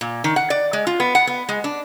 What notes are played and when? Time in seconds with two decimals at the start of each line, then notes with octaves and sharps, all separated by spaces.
0.01 A#2
0.24 D#3
0.36 F#5
0.50 D5
0.73 G#3
0.87 F4
1.00 B3
1.15 F#5
1.27 B3
1.49 G#3
1.64 D4